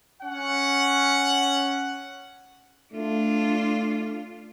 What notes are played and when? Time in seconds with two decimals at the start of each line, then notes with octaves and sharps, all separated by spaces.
0.23 C#4 F#5
2.94 A3 D4 F4